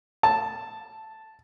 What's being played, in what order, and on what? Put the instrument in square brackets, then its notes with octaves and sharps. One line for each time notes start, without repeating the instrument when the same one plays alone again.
[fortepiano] A5